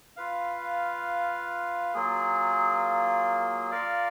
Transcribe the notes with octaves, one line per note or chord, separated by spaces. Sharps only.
F4 B4 F5
F#3 A#3 F4 G#4
F4 A#4 D5 F5